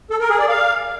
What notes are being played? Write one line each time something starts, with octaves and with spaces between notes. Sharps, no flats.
A4
A#4
G#4
D5
F5